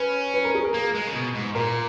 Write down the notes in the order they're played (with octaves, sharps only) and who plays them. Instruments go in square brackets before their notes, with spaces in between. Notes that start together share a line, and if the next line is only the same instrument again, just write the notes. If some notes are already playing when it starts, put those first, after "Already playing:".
Already playing: [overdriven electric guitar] C#4 [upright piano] B4
[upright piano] B4
A#4
G#4
A#4
[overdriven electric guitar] A#3
G#3
C#3
B2
G#2
[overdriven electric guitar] A#2 [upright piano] A#4